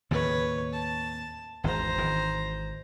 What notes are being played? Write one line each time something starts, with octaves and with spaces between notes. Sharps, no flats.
D#2 A2 C#3 B4 C#5
A5
G#1 E2 C5 A#5
G#1 D#3 E3